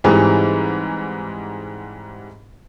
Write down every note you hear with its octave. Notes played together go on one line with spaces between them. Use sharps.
G#2 E3 G3 G#3 C4 D#4